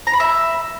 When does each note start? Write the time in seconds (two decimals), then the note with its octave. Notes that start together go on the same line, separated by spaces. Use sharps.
0.07 A#5
0.13 B5
0.20 E5